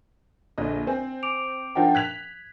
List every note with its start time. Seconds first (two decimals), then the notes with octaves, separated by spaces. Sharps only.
0.58 A#1 D3 D#5
0.87 C4 G#5
1.23 D6 D7 F7
1.75 F3 D4 D#4 A#4 F#5 G5
1.95 F#6 G#6 B6 F7